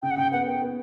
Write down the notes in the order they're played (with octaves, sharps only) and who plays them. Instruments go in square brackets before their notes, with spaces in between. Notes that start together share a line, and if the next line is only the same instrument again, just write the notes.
[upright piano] C#3 [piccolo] G5
[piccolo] F#5
[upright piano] C#3 [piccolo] G5
[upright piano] B3 [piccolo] F#5
[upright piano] B3 [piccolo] G5
[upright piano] B3